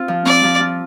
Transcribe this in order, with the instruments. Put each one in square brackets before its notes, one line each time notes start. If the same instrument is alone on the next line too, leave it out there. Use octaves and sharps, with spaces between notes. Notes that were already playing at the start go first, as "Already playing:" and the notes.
Already playing: [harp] C4 F4
F3
[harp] C4 [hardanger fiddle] D5
[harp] F3
F4